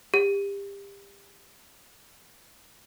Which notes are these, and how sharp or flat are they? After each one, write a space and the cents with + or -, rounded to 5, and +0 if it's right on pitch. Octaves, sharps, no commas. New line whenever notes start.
G4 +30